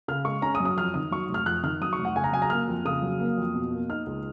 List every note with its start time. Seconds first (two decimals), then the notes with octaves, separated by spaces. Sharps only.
0.08 C#3 F6
0.25 G#3 C#6
0.42 C#4 A#5
0.55 D#6
0.60 F#2
0.65 D#6
0.77 F2 F6
0.94 D#3 D#6
1.11 F#3 C#6
1.29 F1
1.34 F6
1.46 F2 F#6
1.63 D#3 F6
1.81 F#3 D#6
1.93 C#6
1.99 F1
2.05 F#5
2.16 C#3 G#5
2.24 A#5
2.33 F#3 G#5
2.42 A#5
2.50 A#3 F6
2.68 F2
2.85 C#3 D#6
3.02 F#3
3.20 A#3
3.38 F2
3.54 B2
3.71 A#3
3.89 D#4 F6
4.06 C#2